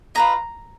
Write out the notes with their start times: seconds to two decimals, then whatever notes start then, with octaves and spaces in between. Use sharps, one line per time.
0.15 F4 B4 D#5 A#5